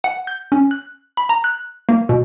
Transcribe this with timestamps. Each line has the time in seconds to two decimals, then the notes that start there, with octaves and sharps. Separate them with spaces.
0.04 F#5
0.27 G6
0.52 C#4
0.71 F#6
1.17 B5
1.29 A#5
1.44 F#6
1.89 A#3
2.09 B2